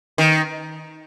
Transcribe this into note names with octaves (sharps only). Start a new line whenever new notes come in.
D#3